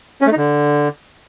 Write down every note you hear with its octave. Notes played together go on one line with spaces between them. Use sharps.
C#4
A3
D#4
D3